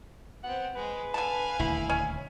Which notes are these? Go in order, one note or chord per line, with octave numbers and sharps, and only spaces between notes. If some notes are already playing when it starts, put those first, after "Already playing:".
B3 C4 F#5
G#3 B4
D3 F5 G#5 A5
D#1 D2 E4
C#4